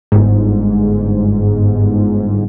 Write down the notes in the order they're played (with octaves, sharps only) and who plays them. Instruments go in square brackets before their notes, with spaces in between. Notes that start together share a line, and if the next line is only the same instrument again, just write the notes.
[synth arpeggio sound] G1 G#2